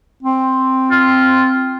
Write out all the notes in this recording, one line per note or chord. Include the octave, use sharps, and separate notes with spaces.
C4
F4